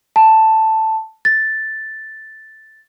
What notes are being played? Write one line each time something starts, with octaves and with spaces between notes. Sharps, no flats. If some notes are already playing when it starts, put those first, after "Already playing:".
A5
A6